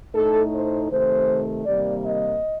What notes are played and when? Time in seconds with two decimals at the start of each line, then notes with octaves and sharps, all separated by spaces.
0.14 A2 A3 D#4 A4
0.52 C5
0.89 C3 D#3 A3 C5
1.65 C3 D#3 G3 A#3 D5
2.04 D#5